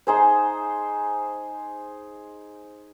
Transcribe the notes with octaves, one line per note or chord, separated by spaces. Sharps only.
D#4 G#4 C5